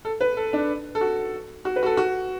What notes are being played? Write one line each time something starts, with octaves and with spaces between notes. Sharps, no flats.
A4
B4
A4
D4
A4
F#4
F#4
B4
F#4
A4
F#4